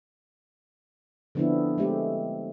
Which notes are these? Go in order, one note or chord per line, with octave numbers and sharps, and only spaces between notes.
D3 F3 B3 C4 D4 E4
G#3 A3 C4 G4